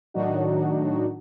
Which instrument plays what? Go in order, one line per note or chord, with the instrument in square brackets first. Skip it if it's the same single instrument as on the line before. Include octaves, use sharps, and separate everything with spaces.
[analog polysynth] A2 D#3 F#3 D4 D#4 F#4